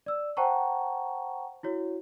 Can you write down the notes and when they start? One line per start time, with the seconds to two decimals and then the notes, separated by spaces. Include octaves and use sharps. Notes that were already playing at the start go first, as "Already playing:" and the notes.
0.06 D5 E6
0.37 C5 F#5 G5 A5 A#5 C#6
1.63 E4 F#4 C#5